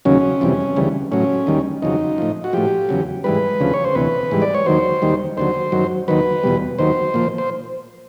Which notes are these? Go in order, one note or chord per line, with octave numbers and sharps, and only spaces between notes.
D#2 C#3 F#3 C#4
F2 C3 E3 G3
D2 C#3 E3 G3
A2 F#3 C#4
D#2 D#3 G3
F2 C#3 F#3 D#4
A2 F3
F#4
A2 F3 G4
E2 C#3 F#3
G#2 E3 G3 B4
D2 C#3 F3
C#5
C5
D2 C3 E3 B4
G#2 E3 G3
D5
C#5
D#2 D#3 F#3 C5
D#2 D#3 G3
D#2 D3 F#3 C5
F#2 D#3 F#3
D#2 D#3 F#3 B4
E2 B2 G3
D#2 D#3 F#3 C5
A#2 F3
C5